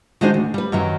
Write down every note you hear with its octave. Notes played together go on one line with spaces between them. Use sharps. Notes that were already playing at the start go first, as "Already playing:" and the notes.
D#3 G#3 D4 D#4 F#4 C5
D2
G3 B4
F#2 D#3 F#3